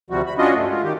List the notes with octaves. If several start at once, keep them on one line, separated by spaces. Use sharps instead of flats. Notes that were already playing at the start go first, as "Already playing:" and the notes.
D2 C3 F3 G3 F#4
B5
C#4 D4 F4 F#4 D#5
G2 A3
G#3 F4
D#3 G4